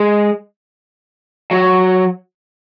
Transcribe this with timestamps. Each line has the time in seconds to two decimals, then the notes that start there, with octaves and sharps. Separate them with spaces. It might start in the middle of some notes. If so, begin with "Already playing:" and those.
Already playing: G#3
1.51 F#3